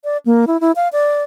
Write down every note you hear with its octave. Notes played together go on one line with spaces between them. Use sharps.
D5
A#3
E4
E4
F5
D5